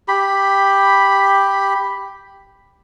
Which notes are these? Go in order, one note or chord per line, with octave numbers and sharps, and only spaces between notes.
G4 B5